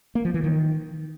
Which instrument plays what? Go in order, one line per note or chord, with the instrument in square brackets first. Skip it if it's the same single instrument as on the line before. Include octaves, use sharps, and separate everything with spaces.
[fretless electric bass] A#3
F3
E3
D#3